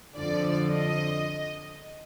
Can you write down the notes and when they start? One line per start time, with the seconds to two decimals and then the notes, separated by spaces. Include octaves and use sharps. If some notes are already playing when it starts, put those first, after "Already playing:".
0.18 F2 D3 F3 D5
0.71 D#5